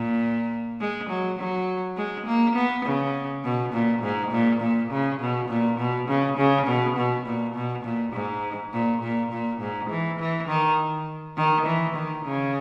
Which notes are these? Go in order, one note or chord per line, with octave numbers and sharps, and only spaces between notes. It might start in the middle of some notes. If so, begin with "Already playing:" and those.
Already playing: A#2
G#3
F#3
F#3
G#3
A#3
B3
C#3
B2
A#2
G#2
A#2
A#2
C#3
B2
A#2
B2
C#3
C#3
B2
B2
A#2
B2
A#2
G#2
A#2
A#2
A#2
G#2
E3
E3
D#3
D#3
E3
D#3
C#3